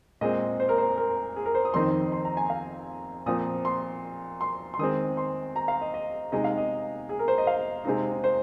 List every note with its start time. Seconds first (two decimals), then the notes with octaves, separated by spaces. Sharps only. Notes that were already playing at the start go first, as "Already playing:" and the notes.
0.21 A#2 G#3 C4 D#5
0.60 C5
0.69 A#4
0.78 C5
0.98 A#4
1.36 G#4
1.46 A#4
1.55 C5
1.65 D#6
1.74 F2 D#3 C4 D#4 C6
2.12 C6
2.25 A#5
2.37 G#5
2.50 F5
3.26 A#2 F3 C4 D#6
3.65 C6
4.41 C6
4.74 C6
4.79 D#3 G#3 C4 D#6
5.17 C6
5.56 A#5
5.68 F5
5.81 D#5
5.94 D#5
6.32 C3 G#3 D#4 D#5
6.44 F5
6.58 D#5
7.09 G#4
7.19 A#4
7.28 C5
7.38 D#5
7.47 F5
7.85 C3 G#3 C4 D#4
8.24 C5